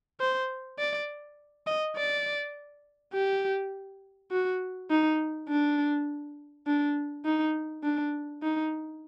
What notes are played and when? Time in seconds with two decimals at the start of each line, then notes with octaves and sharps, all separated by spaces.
0.20 C5
0.79 D5
1.67 D#5
1.96 D5
3.14 G4
4.31 F#4
4.90 D#4
5.49 D4
6.67 D4
7.25 D#4
7.84 D4
8.43 D#4